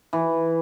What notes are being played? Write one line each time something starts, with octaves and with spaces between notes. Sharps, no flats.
E3